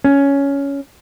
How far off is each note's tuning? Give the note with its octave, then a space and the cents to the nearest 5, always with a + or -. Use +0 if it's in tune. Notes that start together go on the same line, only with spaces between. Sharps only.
C#4 +10